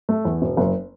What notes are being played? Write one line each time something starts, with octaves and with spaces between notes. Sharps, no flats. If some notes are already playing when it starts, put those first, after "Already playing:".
A3
E2
E1
F#1